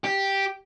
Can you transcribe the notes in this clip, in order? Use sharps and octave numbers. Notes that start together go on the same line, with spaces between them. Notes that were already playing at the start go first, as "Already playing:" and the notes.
G4